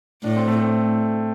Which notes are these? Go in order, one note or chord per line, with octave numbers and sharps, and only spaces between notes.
A2 D4
C4
A3
C4